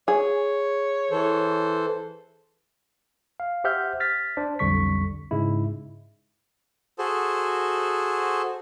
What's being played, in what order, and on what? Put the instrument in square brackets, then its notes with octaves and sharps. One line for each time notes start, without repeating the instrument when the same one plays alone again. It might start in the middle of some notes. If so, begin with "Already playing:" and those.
[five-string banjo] G#4 [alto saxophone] C#5
[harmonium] E3 A4 C5
[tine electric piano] F5
G4 C5 E5 F#5 F6 G6
F6 A6 B6
D4 C5 D5
B1 F2 D3 G3 C#6 B6
G#2 C#3 G#3 E4
[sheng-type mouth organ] F#4 G#4 A4 C5